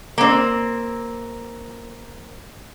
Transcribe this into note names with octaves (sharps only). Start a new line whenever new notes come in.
A#3 C4